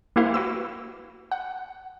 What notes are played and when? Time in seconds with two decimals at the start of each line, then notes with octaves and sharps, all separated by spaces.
0.16 A#3 E4 G4 C5 F5
0.34 F#4 B4 E6
1.32 F#5